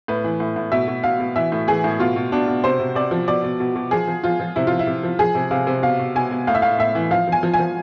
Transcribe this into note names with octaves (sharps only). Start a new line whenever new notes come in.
A2 B4
E3
A2
A2
B2 E5
B2
B2 F5
B2
E3 E5
A2
E3 G#4
A2
B2 F4
B2
B2 D4
B2
C3 C5
C3
C3 D5
F3
B2 D5
B2
B2
B2
F3 G#4
F3
F3 F4
F3
C3 E4
F3 F4
E4
C3
F3
F3 G#4
C3
C3 F5
C3
B2 F5
B2
B2 G#5
B2
A2 F5
E5
A2 F5
A2 E5
E3
F3 F5
F3 G#5
F3
G#5
F3